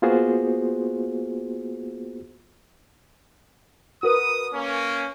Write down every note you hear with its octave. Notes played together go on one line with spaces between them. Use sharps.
A#3 B3 F4 F#4 G#4 C5
F#4 A#4 B4 D#6
A#3 C#4